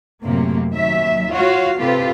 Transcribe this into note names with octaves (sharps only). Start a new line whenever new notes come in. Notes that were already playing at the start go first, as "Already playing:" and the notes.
F#2 A2 C3 A#3
D#2 F#3 E5
F4 F#4 C#5 F5
C3 C4 F4 G4 A4 B4